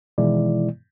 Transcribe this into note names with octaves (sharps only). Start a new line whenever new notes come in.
B2 D#3 E3 G#3 E4 D5